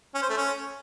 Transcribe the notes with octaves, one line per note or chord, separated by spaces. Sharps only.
C#4
C5
A3
C#4